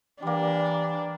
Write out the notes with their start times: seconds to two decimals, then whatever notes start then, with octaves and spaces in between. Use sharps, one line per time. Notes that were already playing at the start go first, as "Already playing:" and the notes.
0.22 E3 G3 A#3 D4